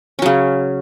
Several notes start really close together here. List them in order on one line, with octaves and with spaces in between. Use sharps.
C#4 F#3 C#3